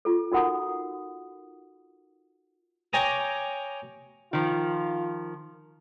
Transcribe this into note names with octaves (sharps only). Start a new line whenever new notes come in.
F4 A4
D#4 F#4 A#4 F#5 A#5 D#6
C#5 G5 G#5 A#5 D6 D#6
D#3 F3 F4